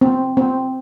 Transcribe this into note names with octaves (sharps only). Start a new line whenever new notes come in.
C4
C4